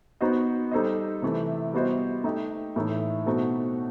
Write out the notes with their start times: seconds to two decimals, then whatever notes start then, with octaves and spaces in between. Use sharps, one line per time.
0.21 B3 D#4 F#4 C5 D#5
0.71 G3 D#4 A4 C5 D#5
1.22 C3 E3 A3
1.73 G3 B3 F#4 C5 D#5
2.24 A3 D#4 G4 D#5
2.76 A2 E3 A3 D#4 A4
3.26 B2 A3 C4 D#4 F#4